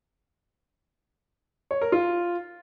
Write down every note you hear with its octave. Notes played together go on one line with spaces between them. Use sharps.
C#5
A#4
F4